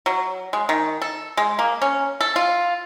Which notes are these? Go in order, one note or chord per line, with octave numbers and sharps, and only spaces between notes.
F#3
G#3
D#3
A4
G#3
A#3
C#4
A4
F4